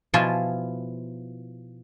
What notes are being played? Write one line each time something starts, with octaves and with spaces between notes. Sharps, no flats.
B2 F3 E4 F4 G#5 A5